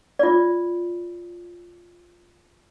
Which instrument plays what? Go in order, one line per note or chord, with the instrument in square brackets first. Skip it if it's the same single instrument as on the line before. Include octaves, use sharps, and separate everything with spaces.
[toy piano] F4 D5